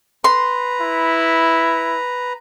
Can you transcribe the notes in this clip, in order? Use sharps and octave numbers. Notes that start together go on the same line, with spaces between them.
B4 A#5 C6
E4